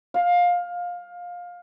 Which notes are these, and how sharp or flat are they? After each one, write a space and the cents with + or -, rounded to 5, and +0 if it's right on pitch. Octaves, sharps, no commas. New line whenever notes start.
F5 +20